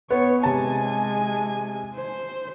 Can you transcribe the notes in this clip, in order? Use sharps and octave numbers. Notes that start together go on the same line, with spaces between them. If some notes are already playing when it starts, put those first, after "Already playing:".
B3 C#5
C3 G#3 G#5 A5
C5